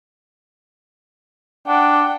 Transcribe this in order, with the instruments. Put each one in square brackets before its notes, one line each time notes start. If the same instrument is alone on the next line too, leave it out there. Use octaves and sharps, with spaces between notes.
[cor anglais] D4 [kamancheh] F#5 G5